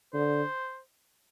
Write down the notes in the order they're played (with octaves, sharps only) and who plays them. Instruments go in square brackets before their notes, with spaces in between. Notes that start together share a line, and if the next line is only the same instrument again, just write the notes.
[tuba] D3 [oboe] C5